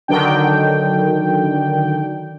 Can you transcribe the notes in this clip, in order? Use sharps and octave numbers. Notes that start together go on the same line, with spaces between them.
D3 D#3 F#3 D4 G5